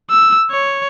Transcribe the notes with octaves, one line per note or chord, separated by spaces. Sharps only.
E6
C#5